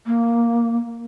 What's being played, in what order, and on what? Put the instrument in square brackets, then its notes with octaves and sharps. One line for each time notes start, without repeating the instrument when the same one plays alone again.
[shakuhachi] A#3